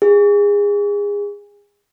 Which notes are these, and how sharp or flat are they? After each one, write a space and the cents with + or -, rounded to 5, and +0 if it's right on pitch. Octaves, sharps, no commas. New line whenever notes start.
G#4 -25